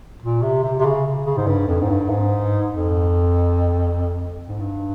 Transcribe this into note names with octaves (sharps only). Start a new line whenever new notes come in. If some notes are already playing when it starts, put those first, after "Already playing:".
A#2
C3
C3
C3
C#3
C#3
G#2
G2
F2
G#2
G2
G#2
F2
G#2
G2